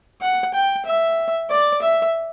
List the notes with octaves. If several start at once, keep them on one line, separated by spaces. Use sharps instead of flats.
F#5
G5
E5
D5
E5